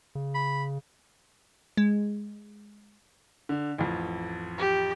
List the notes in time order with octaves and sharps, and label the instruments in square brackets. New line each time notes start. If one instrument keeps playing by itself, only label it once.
[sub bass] C#3
[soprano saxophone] B5
[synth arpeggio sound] G#3
[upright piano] D3
A1 F2
[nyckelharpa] G4